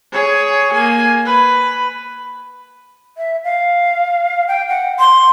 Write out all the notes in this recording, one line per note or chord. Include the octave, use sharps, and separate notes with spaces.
G#4 C#5
A#3 G#5
B4
E5
F5
G5
F#5
C6